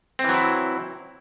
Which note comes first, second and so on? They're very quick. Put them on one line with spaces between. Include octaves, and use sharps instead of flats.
C4 E3 F#3 E4